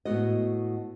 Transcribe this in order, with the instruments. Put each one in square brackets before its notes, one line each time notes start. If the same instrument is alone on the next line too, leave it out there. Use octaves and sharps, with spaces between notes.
[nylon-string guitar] A2 B3 F#4 D#5